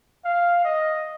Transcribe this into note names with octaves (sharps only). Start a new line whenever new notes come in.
F5
D#5